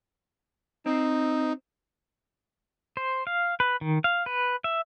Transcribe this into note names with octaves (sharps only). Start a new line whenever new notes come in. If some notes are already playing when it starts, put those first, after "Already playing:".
C4 D#4
C5
F5
B4
D#3
F5
B4
E5